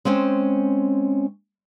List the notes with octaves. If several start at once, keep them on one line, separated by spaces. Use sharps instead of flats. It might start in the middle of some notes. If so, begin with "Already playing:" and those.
G#3 C4 C#4 C5